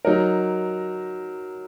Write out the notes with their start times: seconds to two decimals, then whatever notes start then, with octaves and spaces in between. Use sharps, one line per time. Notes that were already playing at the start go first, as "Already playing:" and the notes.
0.05 F#3 D#4 A#4